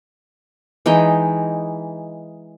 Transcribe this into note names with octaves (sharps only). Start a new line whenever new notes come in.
E3 G#3 D#4 G5